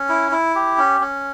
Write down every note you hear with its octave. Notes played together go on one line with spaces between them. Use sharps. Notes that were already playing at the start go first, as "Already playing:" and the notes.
Already playing: C#4
E4
E4
G4
C#4
C#4